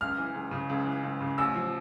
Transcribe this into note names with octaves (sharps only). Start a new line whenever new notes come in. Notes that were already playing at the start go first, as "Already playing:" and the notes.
C#2 F6
E3
C#2
C#3
C#2
E3
C#2
C#3
A1 E6
F3